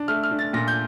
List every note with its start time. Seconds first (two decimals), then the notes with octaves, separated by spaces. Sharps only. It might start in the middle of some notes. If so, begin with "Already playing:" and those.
Already playing: D4
0.08 A3 F6
0.23 F6
0.31 D4
0.39 A6
0.53 A#2 A#6
0.68 G6